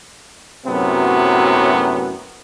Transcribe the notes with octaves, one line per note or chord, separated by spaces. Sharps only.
F#2 A2 C3 F#3 B3